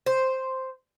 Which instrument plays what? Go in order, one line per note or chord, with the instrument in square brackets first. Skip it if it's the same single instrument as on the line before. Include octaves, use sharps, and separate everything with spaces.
[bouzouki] C5